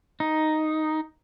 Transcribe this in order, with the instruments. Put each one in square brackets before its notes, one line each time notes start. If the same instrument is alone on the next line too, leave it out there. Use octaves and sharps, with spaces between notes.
[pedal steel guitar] D#4